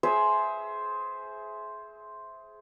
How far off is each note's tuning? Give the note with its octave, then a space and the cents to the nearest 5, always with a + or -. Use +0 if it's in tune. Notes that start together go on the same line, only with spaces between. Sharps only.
G#4 +25 C5 +0 E5 +0